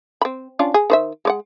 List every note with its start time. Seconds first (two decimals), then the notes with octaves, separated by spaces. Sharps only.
0.21 C4 B5
0.59 C#4 D4 F4
0.74 G#4
0.90 D#3 C5 E5
1.25 G#3 D5 F#5